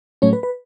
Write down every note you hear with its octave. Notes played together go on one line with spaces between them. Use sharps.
A2 F#3 A3 C#4 C#5
B4
B4